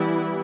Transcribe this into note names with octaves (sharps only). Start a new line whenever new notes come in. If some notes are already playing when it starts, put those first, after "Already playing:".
Already playing: E3 G3 B3 E4